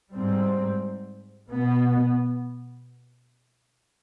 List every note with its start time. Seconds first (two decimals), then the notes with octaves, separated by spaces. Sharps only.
0.13 G#2 G3 C4
1.50 B2 B3